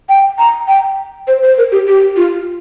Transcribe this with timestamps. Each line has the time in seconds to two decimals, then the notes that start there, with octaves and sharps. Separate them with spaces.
0.09 G5
0.39 A#5
0.68 G5
1.28 C5
1.43 C5
1.58 A#4
1.72 G4
1.87 G4
2.17 F4